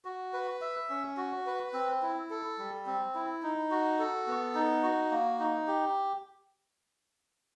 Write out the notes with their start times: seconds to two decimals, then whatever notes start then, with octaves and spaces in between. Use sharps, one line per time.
0.05 F#4
0.33 B4
0.61 E5
0.90 C#4
1.17 F#4
1.46 B4
1.73 C4
2.02 E4
2.30 A4
2.59 G3
2.86 C4
3.15 E4
3.43 D#4
3.71 F#4
3.99 A4
4.27 B3
4.55 D#4
4.83 F#4
5.11 A#3
5.40 D#4
5.67 G4